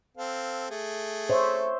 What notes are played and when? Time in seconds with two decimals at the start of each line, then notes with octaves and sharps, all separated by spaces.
0.17 C4 A4 F5
0.70 A3 G#4
1.29 C5 C#5 E5